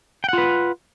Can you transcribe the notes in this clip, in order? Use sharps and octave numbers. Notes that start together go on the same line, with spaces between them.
F4 B4 F#5 G5